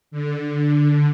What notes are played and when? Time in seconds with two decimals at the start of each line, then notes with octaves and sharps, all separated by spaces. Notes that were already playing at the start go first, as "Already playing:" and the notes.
0.11 D3